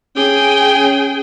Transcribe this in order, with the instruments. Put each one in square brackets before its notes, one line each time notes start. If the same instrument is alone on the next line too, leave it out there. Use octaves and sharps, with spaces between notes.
[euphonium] C#4 [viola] G#4 G5